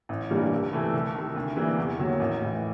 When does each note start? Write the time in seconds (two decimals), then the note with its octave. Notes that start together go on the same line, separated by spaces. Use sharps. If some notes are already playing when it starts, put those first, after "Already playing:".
0.09 A1
0.30 G2 E3 G3 A#3
0.52 C2
0.73 C3 E3 A3
0.93 C2
1.15 C3 D#3
1.36 D2
1.56 C3 E3 G3 A#3
1.78 E2
1.98 C3 D#3 F#3 A#3
2.20 A1
2.40 A2 E3